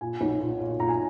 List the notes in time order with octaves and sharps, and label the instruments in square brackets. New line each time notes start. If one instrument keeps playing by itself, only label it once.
[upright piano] A#2 G#5
B1
A#2
A#2
A#2 A#5
G#5